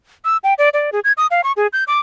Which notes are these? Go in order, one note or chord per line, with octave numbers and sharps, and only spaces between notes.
E6
G5
D5
D5
G#4
G#6
D#6
F5
C#6
G#4
G6
D6